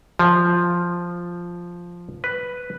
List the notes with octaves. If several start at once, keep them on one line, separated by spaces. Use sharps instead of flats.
F3
B4